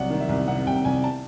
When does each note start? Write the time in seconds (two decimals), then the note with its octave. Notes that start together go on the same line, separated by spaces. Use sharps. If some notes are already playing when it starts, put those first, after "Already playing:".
Already playing: C2 F#3 F#5
0.10 D#3
0.20 E5
0.29 C2
0.48 C3 F#5
0.66 C2 G5
0.85 C2 G#5
1.04 A5